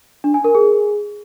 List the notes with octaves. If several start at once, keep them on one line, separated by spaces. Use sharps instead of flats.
D4
G#5
A#4
G#4